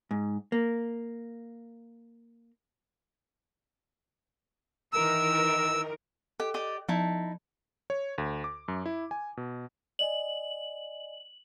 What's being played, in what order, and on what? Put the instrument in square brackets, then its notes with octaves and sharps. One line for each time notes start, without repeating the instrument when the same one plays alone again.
[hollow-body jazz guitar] G#2
A#3
[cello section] D#3 E3 A#4 [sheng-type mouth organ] E6
[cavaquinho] G4 [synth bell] A4
[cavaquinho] G4 D5 D#5
[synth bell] F3 [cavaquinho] D#4 E4 A5
[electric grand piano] C#5
D2
D6
F#2
E4
G#5
B2
[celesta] D5 D#5 G#5 [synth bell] F#7